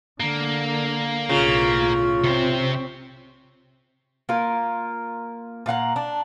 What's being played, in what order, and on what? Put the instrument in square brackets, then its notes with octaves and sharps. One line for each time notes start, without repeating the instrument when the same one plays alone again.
[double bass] D3 [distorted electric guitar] A#3
[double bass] B1 A2 [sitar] C#3 [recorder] F4
[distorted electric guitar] C3 C5 [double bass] C4
[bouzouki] A#3 F4 A#4
A#2 F5 F#5 A#5
D4